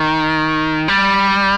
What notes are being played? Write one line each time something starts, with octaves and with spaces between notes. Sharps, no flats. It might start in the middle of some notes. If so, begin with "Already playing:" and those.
Already playing: D#3
G3